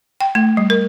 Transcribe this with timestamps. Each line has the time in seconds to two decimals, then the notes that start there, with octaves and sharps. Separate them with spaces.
0.21 G5
0.35 A3
0.57 G3
0.70 A#4